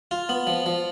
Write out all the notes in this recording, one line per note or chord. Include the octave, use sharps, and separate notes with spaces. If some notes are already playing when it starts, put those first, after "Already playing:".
F4
B3
F3
F3